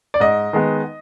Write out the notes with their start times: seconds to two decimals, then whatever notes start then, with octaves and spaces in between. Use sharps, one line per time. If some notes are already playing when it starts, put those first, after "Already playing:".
0.14 D5
0.20 G#2 D#5
0.53 D#3 G#3 B3